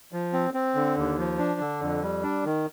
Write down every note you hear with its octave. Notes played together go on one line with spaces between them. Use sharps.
F3
C4
C4
D3
D#2
F3
D4
D3
F2
G3
D4
D#3